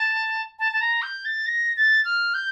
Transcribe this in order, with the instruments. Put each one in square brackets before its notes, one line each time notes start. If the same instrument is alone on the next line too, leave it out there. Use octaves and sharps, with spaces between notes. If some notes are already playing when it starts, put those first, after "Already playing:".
Already playing: [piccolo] A5
A5
A5
A#5
G6
A6
A#6
A6
F6
G6